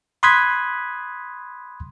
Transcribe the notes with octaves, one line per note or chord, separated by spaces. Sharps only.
B5 C6 D#6 F#6 G#6 B6